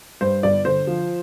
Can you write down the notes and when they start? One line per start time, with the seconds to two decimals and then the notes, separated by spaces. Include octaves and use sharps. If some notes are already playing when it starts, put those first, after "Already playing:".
0.21 G2 C5
0.43 G1 D5
0.65 D3 C5
0.87 F3